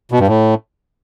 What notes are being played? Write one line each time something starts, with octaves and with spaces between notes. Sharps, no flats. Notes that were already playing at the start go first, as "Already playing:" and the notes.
B2
G2
A2